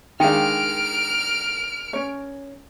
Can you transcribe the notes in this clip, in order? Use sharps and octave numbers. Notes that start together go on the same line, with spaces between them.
D#3 G#3 D4 F5 G5 F6 D7
C#4 C#5